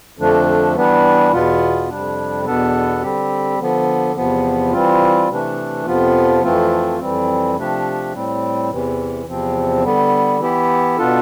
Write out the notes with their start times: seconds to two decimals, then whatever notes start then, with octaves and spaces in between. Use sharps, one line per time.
0.18 F2 D3 F3 A3 D4
0.75 E3 G3 B3 D4
1.31 E2 B2 B3 F4
1.89 F2 C3 G3 D4
2.45 E2 B2 B3 D4 A4
3.02 D3 G3 C4 G4
3.59 D3 F3 B3
4.16 E2 C3 F3 B3
4.72 E3 G3 C4 F4
5.29 C3 E3 A3 D4
5.86 F2 C3 F3 B3 F4
6.43 F2 E3 A3 C4 F4
6.99 F2 E3 G3 C4
7.57 C3 F3 A3 D4 G4
8.14 A2 G3 C4
8.70 E2 C3 E3
9.27 E2 C3 F3 C4
9.84 D3 G3 B3
10.40 E3 B3 E4 G4
10.98 B2 B3 D4 F4 A4